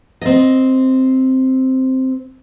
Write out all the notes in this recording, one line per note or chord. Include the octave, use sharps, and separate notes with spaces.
C4 D#5